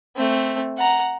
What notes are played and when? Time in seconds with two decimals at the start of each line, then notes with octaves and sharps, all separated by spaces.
0.16 A3 C4
0.78 F#5 A#5